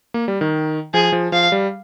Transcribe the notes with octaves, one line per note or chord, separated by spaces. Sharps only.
A#3
G3
D#3
F3 G#4
F3
F3 F5
G3